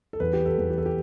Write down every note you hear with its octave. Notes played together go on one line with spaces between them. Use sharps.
A4
E2 B4
G4
A4
E2
G4
A4
G4